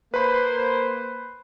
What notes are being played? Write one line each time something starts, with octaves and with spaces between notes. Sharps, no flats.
A#3 B4 C5 B5